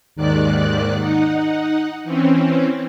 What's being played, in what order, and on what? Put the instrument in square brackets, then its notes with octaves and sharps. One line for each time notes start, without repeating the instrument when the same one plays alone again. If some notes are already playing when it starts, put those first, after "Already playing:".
[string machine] D#2 G#2 D#3 D5 F#6
D#4 F#5
E3 C4 C#4